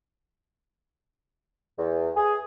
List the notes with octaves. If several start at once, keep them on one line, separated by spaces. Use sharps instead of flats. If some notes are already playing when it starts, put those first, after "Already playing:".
E2
G#4